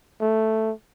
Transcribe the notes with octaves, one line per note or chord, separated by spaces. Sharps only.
A3